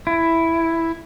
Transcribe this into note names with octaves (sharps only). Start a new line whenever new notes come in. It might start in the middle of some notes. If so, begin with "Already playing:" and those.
E4